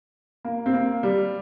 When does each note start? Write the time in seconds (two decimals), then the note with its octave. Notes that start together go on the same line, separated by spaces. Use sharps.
0.45 A#3
0.66 C4
0.73 A#3
1.03 G3